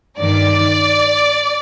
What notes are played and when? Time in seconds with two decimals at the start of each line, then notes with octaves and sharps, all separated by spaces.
0.19 G2 D#3 D5